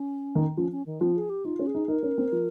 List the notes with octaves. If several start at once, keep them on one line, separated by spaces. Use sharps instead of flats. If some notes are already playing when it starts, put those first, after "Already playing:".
Already playing: C#4
D#3
F3 C#4
C#4
D#3
F3 C4
G#4
G4
D#4 F4
C#4
G#4
D#4
D#4 A#4
C#4
C4
F3